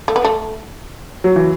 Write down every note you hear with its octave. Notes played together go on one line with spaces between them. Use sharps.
A3
B3
A3
F#3
E3